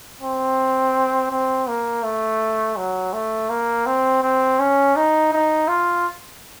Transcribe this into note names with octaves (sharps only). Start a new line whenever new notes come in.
C4
C4
A#3
A3
F#3
A3
A#3
C4
C4
C#4
D#4
D#4
F4